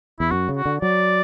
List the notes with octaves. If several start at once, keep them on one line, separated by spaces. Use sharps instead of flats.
E2 E4
F#2 F#4
C#3
F#4
D3
F#3 D5